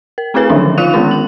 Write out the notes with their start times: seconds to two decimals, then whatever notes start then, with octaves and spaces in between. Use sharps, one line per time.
0.18 A#4
0.34 A3 C4 E4 G#4 B4 G#5
0.50 D3 D#3 F3 F#3 C#4 D4
0.78 D#4 F4 F5 F#6 F7
0.93 D#3 G#3 B3 C#4 D4
1.11 F#7